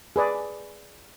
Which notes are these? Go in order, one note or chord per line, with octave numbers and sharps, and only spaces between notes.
G#4 B4 D5